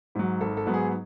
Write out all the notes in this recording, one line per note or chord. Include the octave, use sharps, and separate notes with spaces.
G#2 F#3
G#1 A4
A4
G#2 F#3 B3
G#4